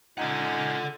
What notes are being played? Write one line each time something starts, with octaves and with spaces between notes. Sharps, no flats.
A#2 G#3 C#4 D#4 A4 F#5 G#5